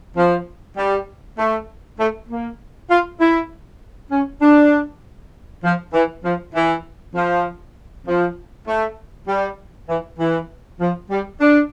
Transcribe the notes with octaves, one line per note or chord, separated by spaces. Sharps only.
F3
G3
A3
A3
A#3
F4
E4
C#4
D4
F3
E3
F3
E3
F3
F3
A3
G3
E3
E3
F3
G3
D4